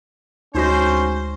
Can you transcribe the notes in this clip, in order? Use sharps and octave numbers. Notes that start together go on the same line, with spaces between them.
D2 G#3 C#4 D#4 F#4 C5 A#6